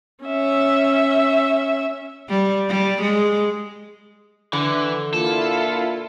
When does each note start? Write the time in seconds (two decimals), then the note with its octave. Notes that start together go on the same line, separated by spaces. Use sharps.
0.24 C#4 E5
2.29 G3
2.69 G3
3.02 G#3
4.53 D3 E3
5.14 A#2 E4 F4 A4